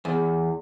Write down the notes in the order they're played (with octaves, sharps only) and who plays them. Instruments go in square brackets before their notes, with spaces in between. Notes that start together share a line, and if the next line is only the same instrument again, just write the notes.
[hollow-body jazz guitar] E2